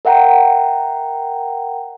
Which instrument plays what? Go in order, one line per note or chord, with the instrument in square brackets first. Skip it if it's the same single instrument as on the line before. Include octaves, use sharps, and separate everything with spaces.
[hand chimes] A#4 E5 F#5 G5 A#5